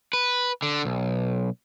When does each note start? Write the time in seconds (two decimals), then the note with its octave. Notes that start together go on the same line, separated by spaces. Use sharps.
0.13 B4
0.62 D3
0.85 B1